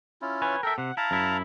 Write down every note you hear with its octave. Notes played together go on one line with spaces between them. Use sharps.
C#4 E4 F4
B4 C#5 G#5
A4 A#4 E5 G5
C3 F#5
E4 F5 A5 A#5
F#2 E4